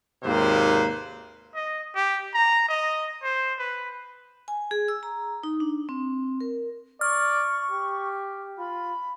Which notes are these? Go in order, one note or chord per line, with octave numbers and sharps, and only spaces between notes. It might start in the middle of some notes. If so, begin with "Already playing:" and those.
G#1 D#2 C3 A#3 B4 C5
D#5
G4
A#5
D#5
C5
B4
G#5
G#4
E6
A#5
D#4
D4
C4
A#4
D5 C#6 F6
G4
F4 B5